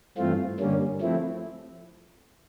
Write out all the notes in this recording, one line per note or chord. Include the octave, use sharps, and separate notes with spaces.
G2 E3 A3 C4 F4
G2 D3 G3 A#3 C#4
F3 A3 C4 E4